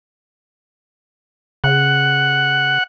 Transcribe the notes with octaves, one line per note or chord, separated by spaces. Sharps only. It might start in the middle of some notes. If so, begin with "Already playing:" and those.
C#3 F#5